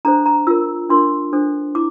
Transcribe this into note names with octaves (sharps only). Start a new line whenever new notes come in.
D4 A4 C5 A#5
A#5
F4 A#4 E6
D4 F4 A#4 C6
D4 A4 C5
E4 D6